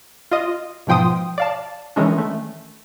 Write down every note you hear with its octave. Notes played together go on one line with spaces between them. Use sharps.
F4 D#5
G#2 B2 F3 G5 C6 D#6
D5 F5 A5
D#3 E3 G#3 C#4 D4
A3